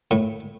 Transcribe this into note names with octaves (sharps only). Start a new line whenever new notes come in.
A2